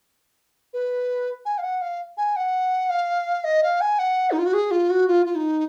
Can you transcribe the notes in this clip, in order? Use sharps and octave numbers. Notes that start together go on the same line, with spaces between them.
B4
G#5
F5
F#5
F5
G#5
F#5
F5
D#5
F5
G#5
F#5
D#4
F4
F#4
G#4
F4
F#4
F4
F4
D#4